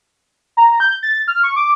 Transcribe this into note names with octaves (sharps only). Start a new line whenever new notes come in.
A#5
G6
A6
F6
C#6
D6